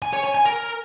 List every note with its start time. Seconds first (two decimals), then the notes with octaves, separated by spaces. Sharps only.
0.02 G#5
0.13 C#5
0.24 G#5
0.35 G#5
0.45 A#4